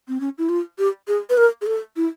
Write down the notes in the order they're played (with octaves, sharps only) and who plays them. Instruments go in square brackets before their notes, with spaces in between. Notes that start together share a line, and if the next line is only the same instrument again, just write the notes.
[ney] C4
C#4
E4
F4
G4
G#4
B4
A#4
G#4
A4
E4